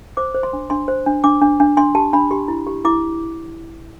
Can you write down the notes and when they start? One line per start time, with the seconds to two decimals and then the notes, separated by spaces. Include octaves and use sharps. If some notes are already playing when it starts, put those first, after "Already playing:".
0.17 C5 D6
0.34 C5
0.43 C6
0.53 D4
0.70 D4 C6
0.88 C5
1.06 D4
1.24 D4 D6
1.42 D4
1.60 D4
1.77 D4 C6
1.95 G4 A5
2.13 D4 B5
2.31 G4 C6
2.48 E4
2.67 G4
2.85 E4 D6